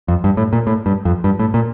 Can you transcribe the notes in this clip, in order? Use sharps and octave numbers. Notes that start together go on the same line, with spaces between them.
F2
G2
A2
A#2
A2
G2
F2
G2
A2
A#2